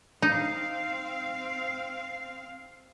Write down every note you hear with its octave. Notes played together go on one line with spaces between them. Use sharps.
C4 D#4 F5